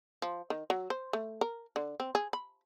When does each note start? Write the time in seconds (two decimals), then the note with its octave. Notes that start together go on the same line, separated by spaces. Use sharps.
0.22 F3
0.50 D#3
0.70 F#3
0.90 C5
1.13 A3
1.41 A#4
1.76 D3
2.00 C4
2.15 G#4
2.33 B5